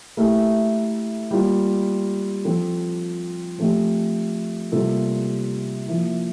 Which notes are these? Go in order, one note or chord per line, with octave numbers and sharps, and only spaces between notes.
A3 E4 G4 A#4
G3 A#3 F4
F3 C4 F4 A4
F3 A3 C4 G4
C3 G3 A#3 F4 A4
F3 A#3 E4